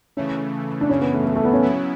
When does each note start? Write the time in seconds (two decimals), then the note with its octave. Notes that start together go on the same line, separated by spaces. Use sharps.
0.17 C#3 E3 A3 C#4
0.81 D4
0.89 F#2 C#3 E3 C#4
1.01 B3
1.14 A3
1.25 A3
1.36 A3
1.45 B3
1.53 C#4
1.62 C#3 F#3 B3 E4